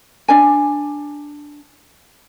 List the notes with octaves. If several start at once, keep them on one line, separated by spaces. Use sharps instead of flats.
D4 D5 G#5